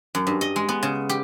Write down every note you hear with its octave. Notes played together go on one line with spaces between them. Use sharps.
F#2
G2
D#5
G#3
B3
C#3
G4